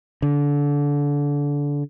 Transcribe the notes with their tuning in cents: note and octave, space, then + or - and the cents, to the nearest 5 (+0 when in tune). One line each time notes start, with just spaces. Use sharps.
D3 -25